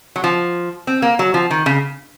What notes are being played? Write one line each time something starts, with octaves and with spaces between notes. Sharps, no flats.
F#3
F3
C4
A#3
F#3
F3
D#3
C#3